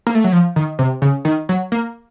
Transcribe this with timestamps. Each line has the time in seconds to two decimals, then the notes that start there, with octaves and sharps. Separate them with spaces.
0.07 A#3
0.15 A3
0.24 F#3
0.32 F3
0.56 D#3
0.79 C3
1.02 C#3
1.25 D#3
1.49 F#3
1.72 A#3